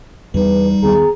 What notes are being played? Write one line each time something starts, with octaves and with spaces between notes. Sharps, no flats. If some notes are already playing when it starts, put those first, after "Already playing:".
E2 E3 G3 D#4 B4
D#2 D#3 B3 G#4 A#5